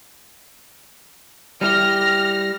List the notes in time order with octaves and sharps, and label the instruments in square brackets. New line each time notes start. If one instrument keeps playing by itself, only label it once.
[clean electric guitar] G3 E4 G4 [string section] F6 A#6